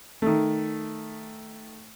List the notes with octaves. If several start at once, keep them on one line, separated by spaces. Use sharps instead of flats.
D#3 A3